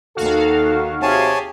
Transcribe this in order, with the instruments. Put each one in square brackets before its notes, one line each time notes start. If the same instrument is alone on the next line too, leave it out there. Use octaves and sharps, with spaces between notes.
[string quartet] D#2 D#3 [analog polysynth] F#4 F5 [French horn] A4
[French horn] C3 [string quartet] G4 G#4 [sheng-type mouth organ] C#5 G#5 A5